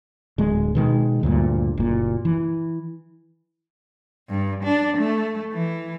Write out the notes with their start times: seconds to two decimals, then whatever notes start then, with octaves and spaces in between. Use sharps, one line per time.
0.38 D1 G#3
0.75 B2 D#3 E3 G#3
1.23 D2 G2 A#2
1.78 F#1 A#2
2.25 E3
4.29 G2
4.64 D4
4.97 A3
5.52 E3